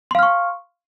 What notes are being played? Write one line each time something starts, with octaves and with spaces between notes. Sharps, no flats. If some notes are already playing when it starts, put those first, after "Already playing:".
F5 C6 C#6 F6